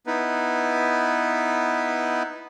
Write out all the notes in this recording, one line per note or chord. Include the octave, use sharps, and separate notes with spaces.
B3 D#4 E4 B4